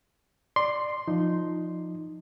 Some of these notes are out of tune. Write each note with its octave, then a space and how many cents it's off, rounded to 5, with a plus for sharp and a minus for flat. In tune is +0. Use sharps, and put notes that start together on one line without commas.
D5 +15 C6 +0
F3 +0 D#4 +0